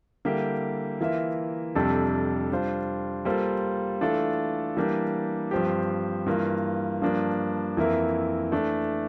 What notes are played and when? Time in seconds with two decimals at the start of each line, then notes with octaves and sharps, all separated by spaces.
0.25 D3 G3 A#3 E4 G4
1.01 E3 A#3 F4 A#4 E5
1.75 F2 C3 G3 D4 A4
2.50 G3 D4 F4 C5
3.25 G3 A#3 F4 A4 C5
4.01 E3 A3 D4 F4 A4
4.77 E3 G3 A#3 D4 G4
5.51 G2 F3 C4 G4
6.26 G2 E3 A#3 F4
7.01 G2 F3 A#3 D4
7.77 F2 E3 A#3 E4 A#4
8.52 E3 A3 D4